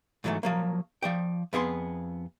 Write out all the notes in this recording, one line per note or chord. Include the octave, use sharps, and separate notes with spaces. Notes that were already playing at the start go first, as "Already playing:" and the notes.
G#2 E3 F#3 G#3 A3
F3 F#3 A#3
F3 D5 G5
F2 B3 G#4 C6